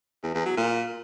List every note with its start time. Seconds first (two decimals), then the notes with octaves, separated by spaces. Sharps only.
0.23 E2
0.34 E2
0.46 F#3
0.57 A#2